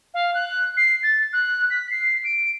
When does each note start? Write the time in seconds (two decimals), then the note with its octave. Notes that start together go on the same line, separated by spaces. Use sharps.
0.14 F5
0.34 F#6
0.77 C7
1.03 A6
1.33 F#6
1.70 B6
1.90 C7
2.24 D7